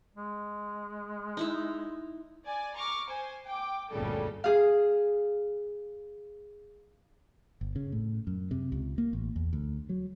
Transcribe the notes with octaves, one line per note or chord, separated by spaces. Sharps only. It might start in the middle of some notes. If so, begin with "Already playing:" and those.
G#3
D#4 E4 E5
D5 G#5
A#5 C#6 D6 F6
C5 G#5
G5 D6
G1 D2 A#2 C#3 G3 A4
G#4 F5
G1
C#3
A2
F#2
C3
C#2
A#3
A1
E2
D2
F#3